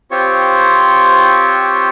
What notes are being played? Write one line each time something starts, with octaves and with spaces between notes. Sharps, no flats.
C4 F4 G4 C5 C#5 C#6